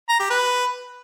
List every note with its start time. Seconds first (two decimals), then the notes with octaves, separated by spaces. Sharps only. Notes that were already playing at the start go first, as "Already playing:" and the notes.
0.09 A#5
0.20 G4
0.30 B4